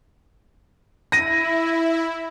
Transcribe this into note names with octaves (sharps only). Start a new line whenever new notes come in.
E4 A#6 D#7